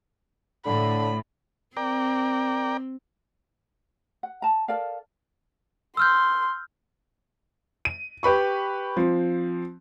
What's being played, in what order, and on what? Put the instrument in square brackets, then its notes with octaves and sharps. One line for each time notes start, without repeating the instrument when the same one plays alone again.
[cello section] A2 [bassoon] D3 [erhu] B5
[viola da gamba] C4 [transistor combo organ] A#4 D5 G5
[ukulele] F#5
A5 A#5
A4 A#4 D5 F5
[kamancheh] C6 [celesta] E6 F6 G6
[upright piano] D#7
G4 B4 B5 C#6
F3 C4